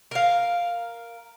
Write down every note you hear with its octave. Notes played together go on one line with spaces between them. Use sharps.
A#4 F5